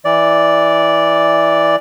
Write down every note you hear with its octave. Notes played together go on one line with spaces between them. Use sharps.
E3 D5